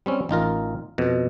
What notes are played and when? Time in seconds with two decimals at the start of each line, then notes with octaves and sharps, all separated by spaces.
0.06 G3 C4 C#4
0.29 A1 D#4 F4 A#4
0.98 F2 B2